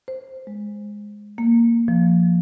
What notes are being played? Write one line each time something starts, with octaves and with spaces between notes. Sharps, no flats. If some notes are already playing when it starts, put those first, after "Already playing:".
C5
G#3
A#3
F3